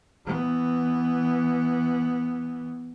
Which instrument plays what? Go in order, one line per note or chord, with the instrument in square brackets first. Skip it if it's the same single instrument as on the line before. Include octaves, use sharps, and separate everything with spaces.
[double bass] E3 B3